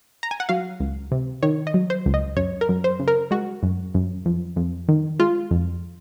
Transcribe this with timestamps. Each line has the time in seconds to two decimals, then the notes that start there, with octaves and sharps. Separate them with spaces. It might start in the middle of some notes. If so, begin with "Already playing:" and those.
0.23 A#5
0.31 G#5
0.40 F#5
0.49 F#3 F5
0.80 C#2
1.12 C3
1.43 D#3 C#5
1.67 D#5
1.74 F#3
1.90 C5
2.06 C#2
2.14 D#5
2.37 F#2 C#5
2.61 A#4
2.69 F#2
2.84 C5
3.00 C#3
3.08 A#4
3.31 G#3 F#4
3.63 F#2
3.95 F#2
4.26 F2
4.56 F2
4.88 D#3
5.20 G#3 F4
5.51 F2